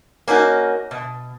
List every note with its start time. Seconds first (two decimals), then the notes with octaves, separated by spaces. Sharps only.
0.28 A#3 C#4 D#4 F#4
0.91 B2